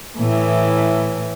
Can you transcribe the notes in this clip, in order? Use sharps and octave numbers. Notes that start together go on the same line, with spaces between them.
A2 E3